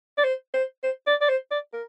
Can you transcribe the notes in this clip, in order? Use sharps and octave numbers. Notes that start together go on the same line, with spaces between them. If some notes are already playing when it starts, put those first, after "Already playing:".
D5
C5
C5
C5
D5
D5
C5
D5
A#4